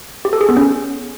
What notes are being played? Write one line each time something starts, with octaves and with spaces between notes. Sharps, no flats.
G4
A4
G#4
B3
C#4